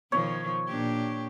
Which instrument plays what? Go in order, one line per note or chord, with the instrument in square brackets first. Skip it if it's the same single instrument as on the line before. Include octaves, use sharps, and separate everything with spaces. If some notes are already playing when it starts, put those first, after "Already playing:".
[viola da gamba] B2 D#3 F3 [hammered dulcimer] C#5
[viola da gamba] A#2 D4 G4